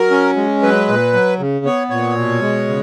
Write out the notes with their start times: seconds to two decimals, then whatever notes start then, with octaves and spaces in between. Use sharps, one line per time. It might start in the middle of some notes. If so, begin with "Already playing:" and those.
Already playing: F#3 A#4
0.11 C#4
0.36 G#3
0.62 F#3 B4
0.88 A#2
1.13 F#3
1.39 C#3
1.65 B3 C#5
1.90 A#2 C#5
2.16 B2
2.41 G#3
2.68 C#3